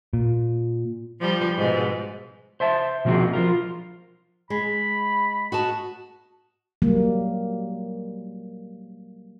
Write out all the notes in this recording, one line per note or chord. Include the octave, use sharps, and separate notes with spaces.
A#2
F3 G3
G#2 B2
C5 E5 A5
B2 F3 A#3 C4 F#4 G#4
F3 F4 A#4
G#3 B5
F#4 D#5 A5
F#3 G3 A#3